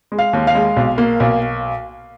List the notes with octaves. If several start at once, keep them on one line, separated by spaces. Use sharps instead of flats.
G#3
F5
D#2
F5
G#3
B1
A#3
B1